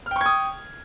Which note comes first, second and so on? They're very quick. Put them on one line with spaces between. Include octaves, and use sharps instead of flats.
F6 G5 C#6 G#6 D#6